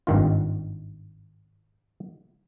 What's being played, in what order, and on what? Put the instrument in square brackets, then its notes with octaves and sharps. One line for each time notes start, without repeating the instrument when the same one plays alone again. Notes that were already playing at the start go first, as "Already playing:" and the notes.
[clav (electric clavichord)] G#1 G2 D#3 F4